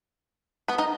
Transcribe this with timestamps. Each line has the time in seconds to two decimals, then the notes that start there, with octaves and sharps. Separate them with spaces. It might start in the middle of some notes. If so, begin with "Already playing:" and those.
0.68 B3 B4
0.78 D#4 D#5